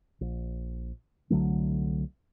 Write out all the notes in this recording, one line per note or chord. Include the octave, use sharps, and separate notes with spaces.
A#1
C2 D3 F#3 A3